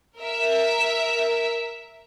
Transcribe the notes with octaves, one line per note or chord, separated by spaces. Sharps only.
A#4 E5